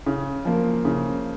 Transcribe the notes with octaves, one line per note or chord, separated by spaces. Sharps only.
C#3
F3 A#3
C#3